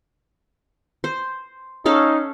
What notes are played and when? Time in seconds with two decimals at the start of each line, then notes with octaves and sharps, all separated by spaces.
1.04 C5
1.86 C#4 D#4 A4 F5